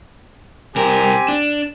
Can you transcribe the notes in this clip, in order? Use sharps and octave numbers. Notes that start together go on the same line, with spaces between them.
C2 C4 G4 A#4 G#5
D4